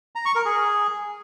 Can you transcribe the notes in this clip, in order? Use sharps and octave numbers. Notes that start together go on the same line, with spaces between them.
A#5
C#6
A#4
G#4